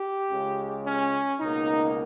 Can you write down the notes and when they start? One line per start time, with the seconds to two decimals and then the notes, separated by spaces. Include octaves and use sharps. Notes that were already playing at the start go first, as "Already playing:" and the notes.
Already playing: G4
0.31 C#2 C#3 G#3
0.86 C#4
1.41 C#2 B2 A#3 D#4